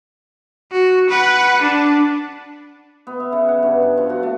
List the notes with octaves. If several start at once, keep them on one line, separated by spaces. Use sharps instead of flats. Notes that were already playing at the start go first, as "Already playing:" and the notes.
F#4
B4 F#5
D4
B3
E5
C#3
F#5
G2
G2
F3
F#4
A3